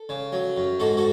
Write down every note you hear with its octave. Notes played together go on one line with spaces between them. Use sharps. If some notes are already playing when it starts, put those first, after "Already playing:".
Already playing: A4
C#3
F#3
F#2
G#2 F#4 A4
F#4 A4